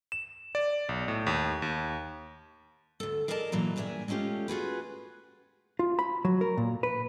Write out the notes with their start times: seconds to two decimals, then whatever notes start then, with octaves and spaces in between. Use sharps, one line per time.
0.12 E7
0.55 D5
0.89 B1
1.08 A2
1.27 D#2
1.62 D#2
3.00 D2 A4
3.28 G#4 A#4 D5 D#5 G#5 A5
3.52 F#2 A#2 E3 F#3 A#5
3.76 G2 A#2 G#4 D5 E5 G#5
4.08 G#3 A3 C#4 F4 G4
4.48 F4 F#4 G#4 B4
5.79 F4
5.99 B5
6.25 F#3
6.41 A#4
6.57 A#2
6.83 B4